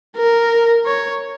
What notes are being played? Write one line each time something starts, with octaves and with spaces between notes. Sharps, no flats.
A#4
C#5